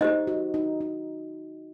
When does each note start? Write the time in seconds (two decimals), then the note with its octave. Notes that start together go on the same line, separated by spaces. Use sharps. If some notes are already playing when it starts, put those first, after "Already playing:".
0.01 D#4 G4 C5 D#5
0.27 F#4
0.54 D#4
0.81 D#4